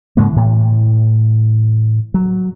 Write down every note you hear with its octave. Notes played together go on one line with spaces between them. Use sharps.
G#2 C#3 G#3 A#3
A2 E3
F#3